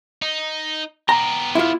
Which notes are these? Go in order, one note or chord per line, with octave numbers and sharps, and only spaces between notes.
D#4
B3 G4 A#5
E4 F4